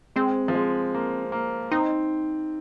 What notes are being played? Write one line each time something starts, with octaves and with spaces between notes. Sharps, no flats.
G#3 C4
F3
G#3
A#3
A#3
C4 D#4